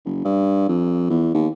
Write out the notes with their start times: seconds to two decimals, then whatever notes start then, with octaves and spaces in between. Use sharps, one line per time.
0.05 F#1
0.25 G2
0.68 F2
1.10 E2
1.34 D#2